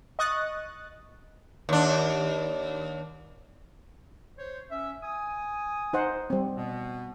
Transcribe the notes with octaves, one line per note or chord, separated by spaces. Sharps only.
D#5 C#6 D#6 F#6 A6
D#2 D4
C5 C#5
C#4 E5
G#5 D#6
D#4 C5 F#5
G3 C4
B2 B3